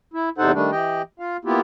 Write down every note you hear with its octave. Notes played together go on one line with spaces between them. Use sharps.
E4
E2 C3 D#4 A4 C5 F#5
D#3 G3 A3 D4
E3 G4 D#5 G5
F4 F5
A#3 B3 E4 F4 G4